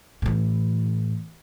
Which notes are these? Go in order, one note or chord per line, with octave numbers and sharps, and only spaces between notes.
A2 E3